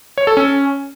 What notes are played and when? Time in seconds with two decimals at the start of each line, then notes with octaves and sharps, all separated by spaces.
0.18 C#5
0.27 A4
0.37 C#4